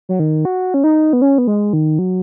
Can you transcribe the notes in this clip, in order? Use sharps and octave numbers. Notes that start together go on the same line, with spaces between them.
F#3
D#3
F#4
C#4
D#4
B3
C#4
B3
G#3
D#3
F#3